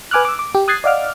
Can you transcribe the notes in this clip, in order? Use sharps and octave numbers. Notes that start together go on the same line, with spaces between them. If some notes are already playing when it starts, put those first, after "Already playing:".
B4 G#5 D6 F6 F#6
D6 E6
D6
G4
D#6 F#6 G#6 A6 C7
D5 D#5 F5 F#5 D6 F6